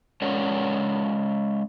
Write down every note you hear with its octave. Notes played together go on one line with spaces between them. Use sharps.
G#3 C#4 A#4 C#5 D5 F#5